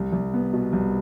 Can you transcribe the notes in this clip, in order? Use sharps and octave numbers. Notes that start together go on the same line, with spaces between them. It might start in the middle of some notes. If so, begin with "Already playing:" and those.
Already playing: C2
C2
B3
B2
C2